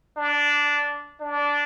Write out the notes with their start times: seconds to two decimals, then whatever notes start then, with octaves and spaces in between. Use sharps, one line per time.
0.17 D4
1.21 D4